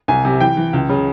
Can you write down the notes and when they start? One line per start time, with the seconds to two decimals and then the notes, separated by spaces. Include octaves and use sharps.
0.08 C2 G#5
0.25 C3
0.40 E3 G5
0.57 E3
0.73 C#2
0.89 C#3